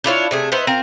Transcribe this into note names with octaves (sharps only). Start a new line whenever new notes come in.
D4 E4 F4 C#5
C3 A3 G#4
B3 D#4 E4 C5
C4 F4 A#4